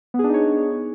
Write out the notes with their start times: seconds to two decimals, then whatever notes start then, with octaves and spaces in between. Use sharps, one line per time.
0.14 B3
0.19 G#4
0.24 D4
0.29 D#4
0.34 C#5